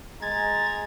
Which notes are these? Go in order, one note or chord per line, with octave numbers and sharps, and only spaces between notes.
G#3 A#5 G#6 A6